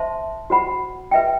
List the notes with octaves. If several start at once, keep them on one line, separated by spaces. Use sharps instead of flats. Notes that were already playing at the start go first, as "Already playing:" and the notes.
Already playing: C5 E5 A5 C6
F#4 C5 F#5 B5
B4 E5 G5